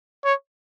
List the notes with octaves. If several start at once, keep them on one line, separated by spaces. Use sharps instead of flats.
C#5